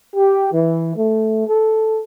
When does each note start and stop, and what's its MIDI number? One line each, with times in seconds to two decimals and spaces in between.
0.16 0.48 67
0.53 0.95 52
0.97 1.46 57
1.47 2.01 69